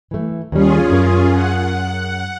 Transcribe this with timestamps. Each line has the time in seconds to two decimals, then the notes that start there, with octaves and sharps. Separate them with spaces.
0.11 E3 A3
0.52 D#2 G3 C#4 F4 G#4
0.89 F#2 A#4
1.30 F#5